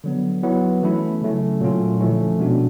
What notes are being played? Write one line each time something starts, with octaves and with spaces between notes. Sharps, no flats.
D3 F#3 B3
F#3 B3 E4
E3 A3 C#4 E4
C#3 F#3 A3 C#4
A#2 F#3 A3 C#4 F4
D3 F3 A3 C#4 E4
B2 G#3 B3 D4 F#4